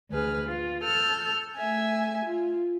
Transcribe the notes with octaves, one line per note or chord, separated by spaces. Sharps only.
D2 G#4 B4 F6
F4
A4 E6 F6 G6
A3 E5 G#5
F4